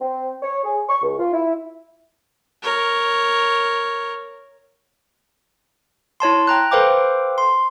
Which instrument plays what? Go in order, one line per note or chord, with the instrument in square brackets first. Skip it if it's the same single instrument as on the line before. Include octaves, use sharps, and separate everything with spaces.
[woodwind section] C4
C#5
G#4
C#6
C#2
F4
E4
[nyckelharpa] A#4 C#5
[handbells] E4 C#5 A5 C6
G5 A#5 F#6
A4 B4 C5 F5 G5 D6
C6